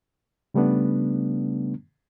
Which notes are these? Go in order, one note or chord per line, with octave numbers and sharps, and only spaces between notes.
C#3 G3 A3 B3 D4